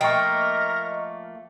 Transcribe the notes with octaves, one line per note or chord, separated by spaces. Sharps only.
F3 A3 A#3 A#4 D#5 G5 A#5 C#6